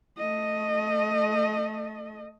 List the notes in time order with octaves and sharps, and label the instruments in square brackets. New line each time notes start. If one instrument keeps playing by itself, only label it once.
[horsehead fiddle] A3 D#5